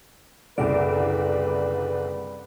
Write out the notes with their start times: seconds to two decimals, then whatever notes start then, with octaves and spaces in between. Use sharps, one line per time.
0.58 F#1 C2 D3 B4 D5